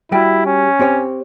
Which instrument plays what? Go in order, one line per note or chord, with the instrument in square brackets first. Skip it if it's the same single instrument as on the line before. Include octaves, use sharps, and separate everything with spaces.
[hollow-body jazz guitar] G3 F#4 G4 [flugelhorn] E4
[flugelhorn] C#4
[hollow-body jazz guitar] C4 G4 C#5